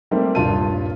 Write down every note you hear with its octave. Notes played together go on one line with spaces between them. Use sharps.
G3 A3 A#3 C4
D#1 G2 F4 A5 D#7